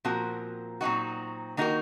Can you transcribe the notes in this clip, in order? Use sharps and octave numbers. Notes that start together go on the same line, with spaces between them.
A#2 F3 C4 F#4 A#4
A#2 F#3 C4 D#4 F#4
D#3 A#3 D#4 F#4 A#4